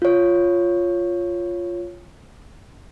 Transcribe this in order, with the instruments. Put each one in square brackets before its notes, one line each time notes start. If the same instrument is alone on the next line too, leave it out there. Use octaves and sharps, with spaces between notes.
[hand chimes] F4 C#5